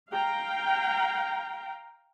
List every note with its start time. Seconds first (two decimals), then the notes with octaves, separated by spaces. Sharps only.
0.11 F5 G5 A#5